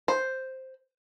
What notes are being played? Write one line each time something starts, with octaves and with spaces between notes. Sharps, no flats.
C5